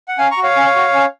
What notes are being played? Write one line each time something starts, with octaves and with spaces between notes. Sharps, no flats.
F#5
C#4 F5 G#5
A#5 C#6
F#4
C#5 F5
C#4
F#4
C#4